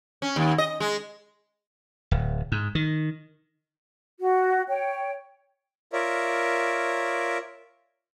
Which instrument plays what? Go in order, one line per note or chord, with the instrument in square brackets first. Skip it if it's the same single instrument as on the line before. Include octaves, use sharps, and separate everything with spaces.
[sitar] C#4
D#2
D#5
G#3
[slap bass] D1
G#2
D#3
[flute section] F#4
C#5 G5
[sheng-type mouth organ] F4 A#4 C#5 D5 E5